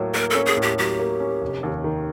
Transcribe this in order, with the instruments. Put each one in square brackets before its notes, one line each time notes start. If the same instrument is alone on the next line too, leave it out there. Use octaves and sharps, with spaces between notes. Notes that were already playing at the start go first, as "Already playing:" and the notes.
Already playing: [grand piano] A2 F#3 A#3
[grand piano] A#3 [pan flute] A#4
[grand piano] C#4 [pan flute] A4
[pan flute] G#4
[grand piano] A2
[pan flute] G4
[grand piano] F#3 [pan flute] G4
[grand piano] A#3
C#4
F1
D#2
D#3